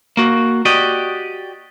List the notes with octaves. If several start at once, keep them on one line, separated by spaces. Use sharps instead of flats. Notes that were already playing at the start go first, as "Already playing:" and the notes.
A#3 F#4
F#4 G4 D5 D#5